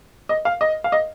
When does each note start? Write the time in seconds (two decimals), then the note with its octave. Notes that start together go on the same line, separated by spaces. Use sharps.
0.29 D#5
0.45 F5
0.61 D#5
0.84 F5
0.92 D#5